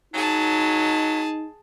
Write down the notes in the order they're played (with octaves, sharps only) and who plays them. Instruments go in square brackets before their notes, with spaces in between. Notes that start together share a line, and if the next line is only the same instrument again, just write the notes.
[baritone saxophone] F#3 [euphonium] D#4 [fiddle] G#4 A5